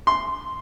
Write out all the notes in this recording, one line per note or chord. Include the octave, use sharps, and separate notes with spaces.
C6